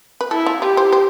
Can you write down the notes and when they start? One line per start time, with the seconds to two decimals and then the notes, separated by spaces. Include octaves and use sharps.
0.21 B4
0.31 E4 A4
0.46 F4
0.62 F4 G4
0.77 C5
0.93 C5